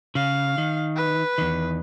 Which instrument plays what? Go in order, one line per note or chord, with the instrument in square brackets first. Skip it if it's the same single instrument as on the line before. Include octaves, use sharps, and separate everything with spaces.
[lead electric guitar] C#3 [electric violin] F5
[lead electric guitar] D#3
[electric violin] B4
[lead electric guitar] E2 D#3